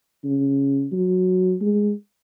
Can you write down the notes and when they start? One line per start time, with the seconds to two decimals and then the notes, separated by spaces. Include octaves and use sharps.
0.24 C#3
0.93 F#3
1.61 G#3